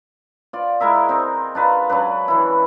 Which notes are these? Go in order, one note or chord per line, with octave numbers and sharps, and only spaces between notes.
F4 D5
G#3 E4 A#4 E5
C4 D#4
D4 F4 B4 A#5
F#3 C#4 D4 B4
E3 E4